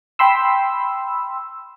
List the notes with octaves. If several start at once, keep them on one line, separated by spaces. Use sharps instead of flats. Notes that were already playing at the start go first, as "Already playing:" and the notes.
G5 B5 C6 E6